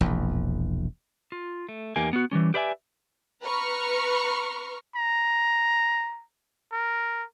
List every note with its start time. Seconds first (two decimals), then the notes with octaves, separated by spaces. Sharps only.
0.01 E1 A#1 E2
1.32 F4
1.69 A3
1.96 E2 A#3 D#4 G4 G#5
2.13 B3 F#4
2.31 E3 F3 G3 C#4
2.54 G4 B4 D5 E5 G5 G#5
3.43 B4 A#5 B5 C#6 F6
4.95 A#5
6.72 A#4